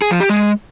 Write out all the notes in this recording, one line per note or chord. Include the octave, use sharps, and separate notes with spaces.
G#4
F3
G4
G#3